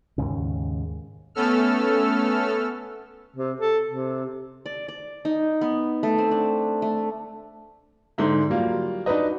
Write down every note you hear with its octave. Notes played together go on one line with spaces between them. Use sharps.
D#2 G#2 C#3
A3 B3 C#4 A4 E6 F6
C3
A4
C3
D5
D5
D#4
B3
A3
C4
D4
A3
G#2 D3 D#4 E4
F#3 G3 A#3 F4
D4 D#4 F#4 B4 D#5